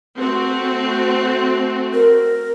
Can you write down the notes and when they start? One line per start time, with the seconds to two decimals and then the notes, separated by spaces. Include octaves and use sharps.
0.19 A3 C4 F#4
1.94 A#4